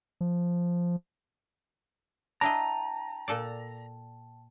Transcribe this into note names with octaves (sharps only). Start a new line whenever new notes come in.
F3
D4 E4 D#5 G5 A5 A#5
A#2 A4 D5